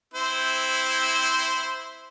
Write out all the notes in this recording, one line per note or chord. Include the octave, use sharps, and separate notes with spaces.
C4 E4 C5